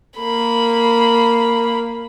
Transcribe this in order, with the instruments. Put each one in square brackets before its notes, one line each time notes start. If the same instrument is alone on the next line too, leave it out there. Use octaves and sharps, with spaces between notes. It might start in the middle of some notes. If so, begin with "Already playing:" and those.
[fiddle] A#3 B5